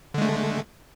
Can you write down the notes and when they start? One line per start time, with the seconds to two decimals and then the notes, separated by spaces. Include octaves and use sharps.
0.14 D3
0.18 G#3
0.22 A3